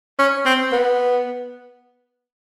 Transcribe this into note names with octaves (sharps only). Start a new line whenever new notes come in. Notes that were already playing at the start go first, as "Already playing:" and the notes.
C#4
C4
B3